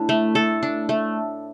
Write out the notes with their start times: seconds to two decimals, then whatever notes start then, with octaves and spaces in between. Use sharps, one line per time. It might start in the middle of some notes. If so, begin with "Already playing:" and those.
Already playing: A2 D4
0.09 A3
0.35 A4
0.63 D4
0.89 A3